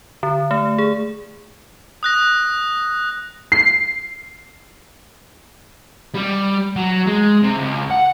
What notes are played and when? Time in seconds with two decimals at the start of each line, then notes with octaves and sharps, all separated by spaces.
0.23 D3
0.51 A3
0.78 G#4
2.03 D#6 F#6 A#6
3.52 C7
6.15 G3
6.76 F#3
7.07 G#3
7.42 C3
7.56 C#2
7.91 F#5